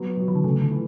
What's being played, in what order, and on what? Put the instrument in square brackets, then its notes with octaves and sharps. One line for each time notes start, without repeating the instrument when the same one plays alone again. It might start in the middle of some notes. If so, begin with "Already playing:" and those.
Already playing: [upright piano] F#3 B3
F#3
[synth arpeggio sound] E3
D3
[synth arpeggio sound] C#3 [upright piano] A3
[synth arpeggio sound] D3
[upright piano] E3